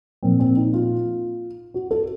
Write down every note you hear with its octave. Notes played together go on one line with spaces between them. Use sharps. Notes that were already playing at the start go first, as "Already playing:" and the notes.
A#2 F3 C4
C4
D#4
F4
F#4
A4